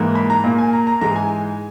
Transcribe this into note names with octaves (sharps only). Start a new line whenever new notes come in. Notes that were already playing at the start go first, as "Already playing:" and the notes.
Already playing: G#2 E3 A#3
B5
A#5
A#2 A#3
G#5
A#5
A#5
G#2 E3 G#3 A#5
G#5